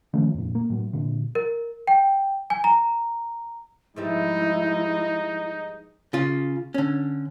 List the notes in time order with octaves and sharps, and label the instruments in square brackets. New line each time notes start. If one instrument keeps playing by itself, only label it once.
[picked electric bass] D#3 F3 A3 C#4
F2 A#2
A#3
A2 F#3
A#2 D3
[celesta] A#4
G5
G#5
A#5
[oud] G#2 E3 G3 [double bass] F3 G#3 [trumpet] D#4 [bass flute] E4
[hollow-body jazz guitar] C#3 F4
D3 C#4